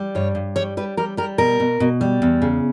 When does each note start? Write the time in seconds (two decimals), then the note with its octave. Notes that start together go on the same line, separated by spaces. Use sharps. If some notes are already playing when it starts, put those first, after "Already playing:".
Already playing: G3
0.15 G2 C#5
0.35 G2
0.56 G3 C#5
0.77 G3 B4
0.97 G3 A#4
1.17 G3 A#4
1.38 B2 A#4
1.60 B2
1.80 B2
2.01 G3
2.22 E2
2.42 C#3